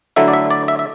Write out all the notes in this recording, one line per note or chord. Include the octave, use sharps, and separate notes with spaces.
D3 F#3 A3 E4 E5
D5
E5
D5
E5
E5